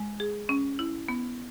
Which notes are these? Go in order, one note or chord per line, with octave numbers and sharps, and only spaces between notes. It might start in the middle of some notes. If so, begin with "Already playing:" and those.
Already playing: G#3
G#4
C#4
E4
B3